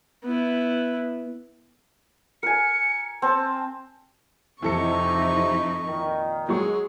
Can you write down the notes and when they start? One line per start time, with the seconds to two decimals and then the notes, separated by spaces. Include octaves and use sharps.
0.24 B3 E4
2.43 A#4 G#5 C#7
3.22 C4 A5
4.62 F2 C3 E3 D#4 E4 A4 C#6 C#7
5.86 A#2 D#3
6.49 F#3 G#3 G#4 C#6